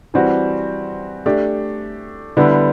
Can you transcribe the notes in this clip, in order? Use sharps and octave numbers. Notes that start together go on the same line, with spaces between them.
E3 G3 C4 F#4
A3 D4 G4
D3 G3 B3 E4